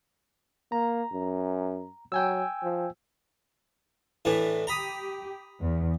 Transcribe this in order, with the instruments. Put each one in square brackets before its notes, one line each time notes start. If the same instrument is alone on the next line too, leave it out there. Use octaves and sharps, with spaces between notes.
[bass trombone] A#3 [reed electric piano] A#5
[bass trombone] F#2
[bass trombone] F#3 [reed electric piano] G5 G#5 E6
[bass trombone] F3
[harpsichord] A2 E3 D4
[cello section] G4 [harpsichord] A#5 B5 D#6
[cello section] E2